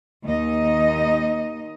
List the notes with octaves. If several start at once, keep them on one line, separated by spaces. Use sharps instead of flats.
D#2 D#4 D#5